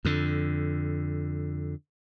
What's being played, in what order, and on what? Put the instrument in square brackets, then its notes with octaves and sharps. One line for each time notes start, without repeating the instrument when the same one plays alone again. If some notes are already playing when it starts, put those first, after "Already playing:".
[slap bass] F2 D3